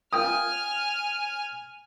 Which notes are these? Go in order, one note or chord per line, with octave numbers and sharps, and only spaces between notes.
F4 G5 G#5 D#6 F6